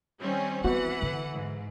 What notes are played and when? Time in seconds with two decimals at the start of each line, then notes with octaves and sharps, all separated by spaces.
0.20 D#3 G3 C4 C#4
0.64 E3 B3 C4 F#4 F#5
1.02 D3
1.32 G#2